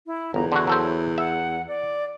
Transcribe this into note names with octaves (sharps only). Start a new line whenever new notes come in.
E4
G1 E2 A#5
D3 E4 F#4
F#3 A4 C5
E5 F#5
D5